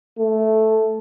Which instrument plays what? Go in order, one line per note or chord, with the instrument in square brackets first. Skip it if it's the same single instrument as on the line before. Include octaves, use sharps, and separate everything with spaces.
[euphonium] A3